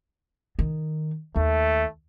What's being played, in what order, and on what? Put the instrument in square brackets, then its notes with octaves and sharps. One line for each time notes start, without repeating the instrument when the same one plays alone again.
[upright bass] D#3
[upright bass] D#2 [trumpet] A3